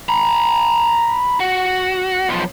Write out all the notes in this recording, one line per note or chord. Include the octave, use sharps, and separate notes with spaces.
A#5 B5
F#4
B1 F3